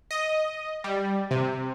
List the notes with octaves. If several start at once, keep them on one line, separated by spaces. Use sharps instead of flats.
D#5
G3
C3